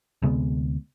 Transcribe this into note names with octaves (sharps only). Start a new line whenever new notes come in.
D2 C3 G#3 B3